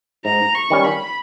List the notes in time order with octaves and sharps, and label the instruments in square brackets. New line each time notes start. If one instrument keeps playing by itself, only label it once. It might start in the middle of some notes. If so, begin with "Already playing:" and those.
[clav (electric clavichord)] G#2 [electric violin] A#5
[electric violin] C#6
[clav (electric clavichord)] D#3 G3 C#4
[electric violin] B5